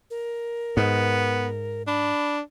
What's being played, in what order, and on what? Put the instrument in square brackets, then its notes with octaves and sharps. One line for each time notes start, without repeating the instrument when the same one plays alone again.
[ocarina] A#4
[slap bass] G#2 [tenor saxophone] B3
[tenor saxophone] D4 [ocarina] B5